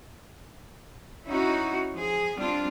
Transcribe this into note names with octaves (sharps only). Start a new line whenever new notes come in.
C#4 D#4 E4 F#4
F3 G#4
G3 C4 D4 F4